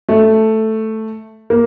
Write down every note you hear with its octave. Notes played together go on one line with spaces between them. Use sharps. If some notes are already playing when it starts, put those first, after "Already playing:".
A3
A#3